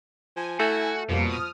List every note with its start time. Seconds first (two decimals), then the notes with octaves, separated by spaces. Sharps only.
0.36 F3 G#5
0.60 A3 E4 F#4
1.09 F2 B2 F3 G3 A#3
1.27 D#6 F6